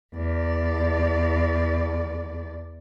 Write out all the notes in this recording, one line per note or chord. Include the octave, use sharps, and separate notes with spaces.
E2 D5